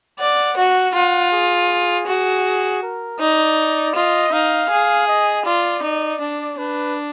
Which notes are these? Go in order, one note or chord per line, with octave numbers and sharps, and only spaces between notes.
D5 F#5
F#4
F4 F#5
G#4
F#4
A#4
D#4 D5
F4 D#5
D#4 F5
G#4
D#5
F4 D5
D#4
D4
D4 B4